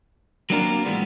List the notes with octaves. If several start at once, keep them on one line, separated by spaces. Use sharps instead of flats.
F#3 A#3 C4 D4 F4 A#4
A2 E3 G3 G#3 B3